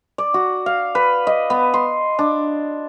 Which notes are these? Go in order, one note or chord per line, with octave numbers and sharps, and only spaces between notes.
D5
F#4
F5
B4
D#5
B3
C6
D4